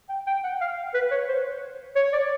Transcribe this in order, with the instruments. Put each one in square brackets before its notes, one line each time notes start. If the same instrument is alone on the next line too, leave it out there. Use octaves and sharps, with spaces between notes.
[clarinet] G5
G5
F#5
F5
B4
C#5
C5
C#5
D5